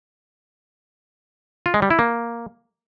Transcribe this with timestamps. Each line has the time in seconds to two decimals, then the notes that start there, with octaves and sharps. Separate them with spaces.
1.66 F4
1.74 G#3
1.82 G3
1.90 E4
1.99 A#3